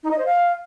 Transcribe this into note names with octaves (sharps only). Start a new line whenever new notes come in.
D#4
D#5
C5
F5